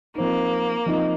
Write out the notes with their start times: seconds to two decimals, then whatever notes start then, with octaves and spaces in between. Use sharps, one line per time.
0.15 F3 A#3 C4 D#4
0.86 F3 C4 D#4